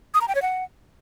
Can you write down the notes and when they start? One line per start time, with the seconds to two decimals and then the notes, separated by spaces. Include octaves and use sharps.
0.14 D#6
0.21 A#5
0.28 G5
0.35 C#5
0.42 F#5